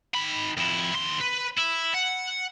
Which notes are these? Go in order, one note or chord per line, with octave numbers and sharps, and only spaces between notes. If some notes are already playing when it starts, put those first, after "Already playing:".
D#3 B5
F2 E4
D#2 C6
B4
E4
F#5